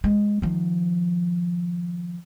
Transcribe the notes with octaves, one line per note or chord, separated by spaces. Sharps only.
G#3
D#3 F3